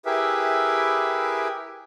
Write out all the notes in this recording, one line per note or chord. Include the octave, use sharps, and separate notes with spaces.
E4 G4 G#4 A#4 B4 E5